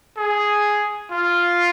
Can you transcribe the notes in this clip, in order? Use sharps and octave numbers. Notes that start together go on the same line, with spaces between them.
G#4
F4